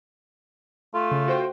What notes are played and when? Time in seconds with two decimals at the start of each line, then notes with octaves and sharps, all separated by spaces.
0.94 A3 F4
1.11 C#3
1.27 F#4 C5 G5